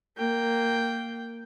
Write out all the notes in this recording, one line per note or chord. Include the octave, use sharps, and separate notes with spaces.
A#3 G5